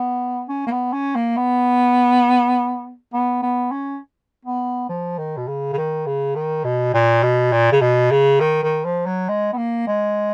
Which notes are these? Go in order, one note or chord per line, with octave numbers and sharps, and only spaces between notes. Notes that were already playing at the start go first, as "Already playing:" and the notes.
Already playing: B3
C#4
A#3
B3
C#4
A#3
B3
B3
B3
C#4
B3
F3
D#3
B2
C#3
C#3
D#3
C#3
D#3
B2
A#2
B2
A#2
C#3
B2
C#3
D#3
D#3
F3
F#3
G#3
B3
A#3
G#3